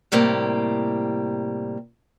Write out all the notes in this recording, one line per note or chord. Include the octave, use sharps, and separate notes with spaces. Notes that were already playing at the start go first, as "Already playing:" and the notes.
A2 C3 G3 A#3